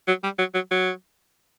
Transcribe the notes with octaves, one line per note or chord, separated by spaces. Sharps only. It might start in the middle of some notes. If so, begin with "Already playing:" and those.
F#3
G3
F#3
F#3
F#3